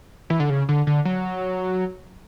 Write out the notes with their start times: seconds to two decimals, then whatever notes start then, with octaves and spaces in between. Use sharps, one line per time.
0.30 E3
0.40 D3
0.50 C#3
0.69 D3
0.87 D3
1.05 F#3